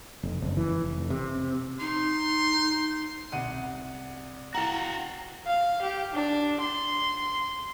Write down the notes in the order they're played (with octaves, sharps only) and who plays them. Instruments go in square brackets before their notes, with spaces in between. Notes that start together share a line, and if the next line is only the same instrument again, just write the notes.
[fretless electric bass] F1
F#1
E3
F1
C3
[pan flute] D#4 [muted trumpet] C6
[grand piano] C2 F#5 D#7
[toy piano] E4 G5 A#5 [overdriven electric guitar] F#4 F5
[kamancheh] F5
G4
D4
C6